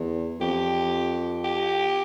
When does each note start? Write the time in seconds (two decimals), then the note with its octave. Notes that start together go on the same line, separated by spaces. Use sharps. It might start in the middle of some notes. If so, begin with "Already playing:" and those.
Already playing: E2
0.40 F2 G4
1.44 G4